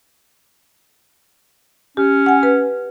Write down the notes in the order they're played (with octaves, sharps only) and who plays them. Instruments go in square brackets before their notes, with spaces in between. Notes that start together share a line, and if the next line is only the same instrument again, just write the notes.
[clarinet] C#4 [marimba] G4
[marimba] F#5 G#5
B4